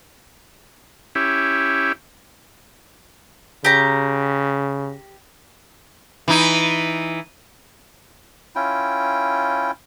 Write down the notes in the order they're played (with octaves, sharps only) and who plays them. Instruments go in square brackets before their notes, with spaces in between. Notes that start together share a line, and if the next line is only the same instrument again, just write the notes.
[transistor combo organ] C#4 E4 G4
[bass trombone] C#3 [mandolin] G4 A#5
[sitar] E3 D#4
[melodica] C#4 E4 F4 G5